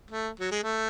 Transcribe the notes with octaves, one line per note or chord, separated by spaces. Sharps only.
A3
F#3
G#3
A3